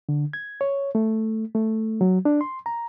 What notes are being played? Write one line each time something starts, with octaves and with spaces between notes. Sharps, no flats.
D3
G#6
C#5
A3
A3
F#3
D4
C6
A#5